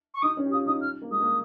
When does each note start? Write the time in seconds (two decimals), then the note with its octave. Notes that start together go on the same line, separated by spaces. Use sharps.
0.14 C#6
0.22 D#4 D#6
0.37 C#4
0.45 G4
0.52 F4 D#6
0.66 D#4 D#6
0.81 F6
1.02 A#3
1.11 G#3 D#6
1.21 A#3